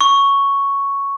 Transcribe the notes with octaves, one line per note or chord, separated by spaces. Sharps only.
C#6